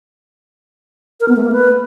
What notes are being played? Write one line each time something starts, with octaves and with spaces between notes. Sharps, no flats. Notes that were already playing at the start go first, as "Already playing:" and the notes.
A#4
B3
A3
A#3
B4